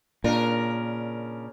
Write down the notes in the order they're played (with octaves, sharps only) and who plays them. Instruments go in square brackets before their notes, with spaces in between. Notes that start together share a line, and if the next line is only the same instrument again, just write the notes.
[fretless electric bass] A#2 [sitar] C#3 D4 A#4